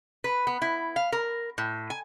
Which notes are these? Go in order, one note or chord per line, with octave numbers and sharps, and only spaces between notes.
B4
B3
E4
F5
A#4
A2
G#5